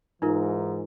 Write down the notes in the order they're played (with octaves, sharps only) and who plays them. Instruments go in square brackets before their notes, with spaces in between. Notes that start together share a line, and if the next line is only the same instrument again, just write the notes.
[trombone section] G#2 E3 [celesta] D#4 F4 A#4